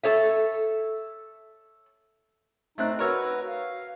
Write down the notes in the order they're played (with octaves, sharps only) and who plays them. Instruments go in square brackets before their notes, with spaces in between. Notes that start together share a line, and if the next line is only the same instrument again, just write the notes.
[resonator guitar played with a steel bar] A4 C#5 E5
[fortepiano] A3 C4 F#6 [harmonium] D#4
[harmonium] F#4 B4 [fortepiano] A#4 C#5 E6
[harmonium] F5